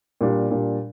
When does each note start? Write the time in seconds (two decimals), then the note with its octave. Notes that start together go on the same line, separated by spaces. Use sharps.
0.21 A#2 G3 D4
0.51 A#2 G3 D4